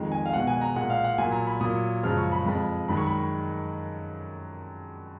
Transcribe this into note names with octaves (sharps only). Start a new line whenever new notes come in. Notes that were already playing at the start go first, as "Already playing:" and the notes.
Already playing: F2 D#3 G#3
G#5
F5
B2 G#3 F#5
G#5
A#5
A#2 G#3 F#5
F5
F#5
A#2 F#3 G#5
A#5
B5
A#2 F#3 D#6
F#2 C#3 F3 G#3 F6
C#6
B5
F2 F3 G#3 B5
F#2 D#3 G#3 B5
C#6
B5